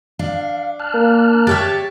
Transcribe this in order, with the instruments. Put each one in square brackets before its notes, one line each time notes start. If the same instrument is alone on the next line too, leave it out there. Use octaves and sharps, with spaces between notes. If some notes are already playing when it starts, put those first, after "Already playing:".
[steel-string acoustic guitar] D4 [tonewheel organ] F5
[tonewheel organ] A5 F6 F#6
[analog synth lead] A#3
[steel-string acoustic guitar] G4 C#5 E5 [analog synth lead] A6